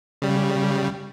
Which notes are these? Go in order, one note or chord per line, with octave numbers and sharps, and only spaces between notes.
C#3 G3